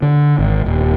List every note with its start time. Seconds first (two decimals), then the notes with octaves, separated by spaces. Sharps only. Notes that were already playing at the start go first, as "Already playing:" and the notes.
0.02 D3
0.39 G#1
0.66 D#1